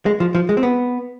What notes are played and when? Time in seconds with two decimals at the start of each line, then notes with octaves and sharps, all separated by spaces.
0.06 G#3
0.20 F3
0.35 F3
0.49 G#3
0.57 C4
0.63 B3